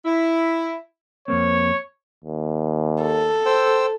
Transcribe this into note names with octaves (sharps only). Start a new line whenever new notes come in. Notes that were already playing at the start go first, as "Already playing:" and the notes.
E4
F2 A#3 C4 C#5
D#2
A4
C5 G5 E6